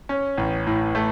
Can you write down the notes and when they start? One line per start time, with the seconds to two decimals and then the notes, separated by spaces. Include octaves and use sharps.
0.09 C#4
0.37 A1
0.67 A2
0.95 A3